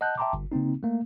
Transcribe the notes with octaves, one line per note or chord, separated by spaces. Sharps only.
D#5 F#5 A5 F#6 G6
E5 G5 A5 A#5 C6 D6
G1
C#3 A#3 C4 D#4
A3 A#3